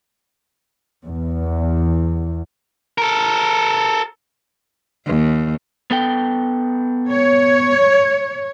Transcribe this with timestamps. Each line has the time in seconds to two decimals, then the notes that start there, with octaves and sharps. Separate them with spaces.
1.04 E2
2.98 A4 A#4
5.07 D#2
5.91 B3 A4 G5
7.11 C#5